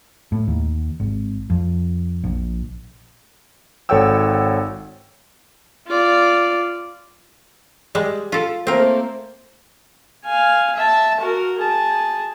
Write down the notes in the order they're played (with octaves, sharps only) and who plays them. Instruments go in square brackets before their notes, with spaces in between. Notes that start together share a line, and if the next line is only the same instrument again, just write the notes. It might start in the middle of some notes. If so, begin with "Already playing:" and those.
[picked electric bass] A2
D#2
G#1
F2
A#1
[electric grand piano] G#1 A4 C#5 F#5 G5 E6
[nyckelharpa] F4 D5
[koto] G3 G#3
F4 A4
[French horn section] A3 A#3 C5 [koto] C4 A#4
[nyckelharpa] F5 G#5
E5 A5
F#4 A#4
G#4 A5